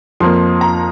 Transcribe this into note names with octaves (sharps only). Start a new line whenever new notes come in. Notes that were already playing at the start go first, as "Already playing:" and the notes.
F2 F3 A#3 C6
A#5